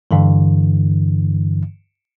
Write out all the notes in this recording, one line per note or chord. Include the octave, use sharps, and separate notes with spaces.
G2 D3 E3